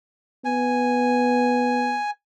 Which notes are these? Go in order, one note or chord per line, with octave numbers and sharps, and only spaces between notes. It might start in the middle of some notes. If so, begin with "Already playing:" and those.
B3 G#5